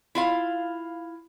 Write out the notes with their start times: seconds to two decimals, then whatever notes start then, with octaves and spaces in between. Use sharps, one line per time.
0.15 E4 F4 F5